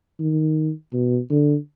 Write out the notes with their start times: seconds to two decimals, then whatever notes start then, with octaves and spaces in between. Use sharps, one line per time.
0.20 D#3
0.93 B2
1.30 D3